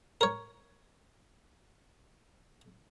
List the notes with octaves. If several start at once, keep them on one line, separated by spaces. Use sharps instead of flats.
A#4 C#5